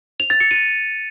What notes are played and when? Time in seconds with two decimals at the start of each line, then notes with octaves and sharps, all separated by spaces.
0.20 F7
0.30 A6
0.40 C#7
0.51 D#7